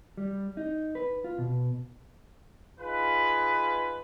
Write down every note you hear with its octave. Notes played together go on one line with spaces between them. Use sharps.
G3
D#4
B4
F4
B2
D#4 F4 G#4 B4